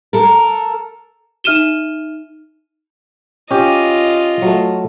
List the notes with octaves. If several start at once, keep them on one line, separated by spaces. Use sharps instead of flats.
A4 A#4
D#4 E5 F6 D#7 E7 G7
C#4 F4 G4 D#5
F#3 A3